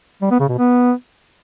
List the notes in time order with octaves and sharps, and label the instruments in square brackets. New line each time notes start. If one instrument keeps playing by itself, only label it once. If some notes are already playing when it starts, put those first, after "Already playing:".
[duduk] G3
B3
C#3
B2
B3